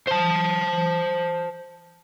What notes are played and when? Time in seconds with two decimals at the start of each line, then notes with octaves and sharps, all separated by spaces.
0.07 C5 A5